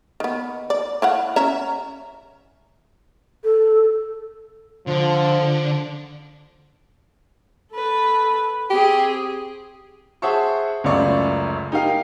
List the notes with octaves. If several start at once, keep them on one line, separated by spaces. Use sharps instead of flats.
D#3 B3
D5
E4 F5 F#5
C#4 E5 A#5
A4
D3 F3
A4 B4
C4 G4 G#4
G#4 C5 E5 F#5 A5 C#6
C#2 F#2 A3 D5 C#6
D#4 G4 A#4 F5